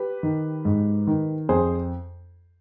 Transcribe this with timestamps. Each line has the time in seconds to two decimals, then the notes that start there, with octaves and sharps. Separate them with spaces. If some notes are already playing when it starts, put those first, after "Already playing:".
Already playing: G4 B4
0.23 D#3
0.65 G#2
1.07 D#3
1.49 F2 G#4 C5